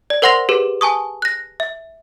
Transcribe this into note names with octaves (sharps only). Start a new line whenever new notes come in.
D5
A#4 C5 F#5 C6 A#6 F7
G4 G#4 B4
G#5 A5 C#6 D#6
F#6 A#6
E5